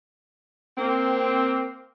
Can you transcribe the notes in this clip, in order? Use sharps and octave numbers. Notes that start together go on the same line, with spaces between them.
A#3 C4